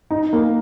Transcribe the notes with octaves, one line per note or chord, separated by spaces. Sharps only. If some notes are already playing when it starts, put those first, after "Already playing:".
D#4
A#3